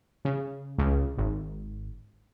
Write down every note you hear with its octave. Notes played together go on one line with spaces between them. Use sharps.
C#3
C#2
G#1